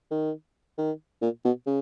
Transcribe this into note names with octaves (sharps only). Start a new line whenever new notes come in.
D#3
D#3
A#2
B2
C#3